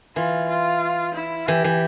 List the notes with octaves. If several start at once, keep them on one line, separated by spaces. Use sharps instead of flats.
E3 F4
F4
E4
E3 G4
E3